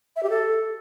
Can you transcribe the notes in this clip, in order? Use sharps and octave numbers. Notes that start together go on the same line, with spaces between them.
E5
G4
A4